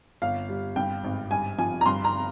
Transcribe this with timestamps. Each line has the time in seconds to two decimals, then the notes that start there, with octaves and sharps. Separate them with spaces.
0.22 G1 F5
0.49 G3
0.76 G2 G5
1.04 G#1
1.31 G2 G#5
1.58 F3 G#5
1.81 A#5
1.86 G2 C6
2.04 A#5